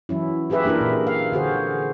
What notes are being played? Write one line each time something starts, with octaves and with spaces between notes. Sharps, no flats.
E3 F#3 C#4 E4
F4 G4 G#4 B4 E5
A#3 D4 E4 F4 A#4
A#2
F5
D3 F#4 G#4 C5